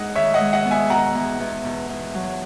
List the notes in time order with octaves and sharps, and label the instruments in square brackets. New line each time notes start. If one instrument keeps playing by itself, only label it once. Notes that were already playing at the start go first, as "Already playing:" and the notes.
Already playing: [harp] G#2 [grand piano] D#5 F#5
[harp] D#3 [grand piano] C#5 E5
[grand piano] D#5 F#5
[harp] G#3
[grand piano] D#5 F#5
[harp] B3
[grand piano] E5 G#5
[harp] B2 [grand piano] F#5 A#5
[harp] E2
E2
B2
E2
F#3